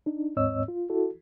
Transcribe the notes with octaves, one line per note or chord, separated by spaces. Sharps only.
D4 D#4
D#2 G#2 C4 C#5 D#5 E6
F4
E4 F#4 A4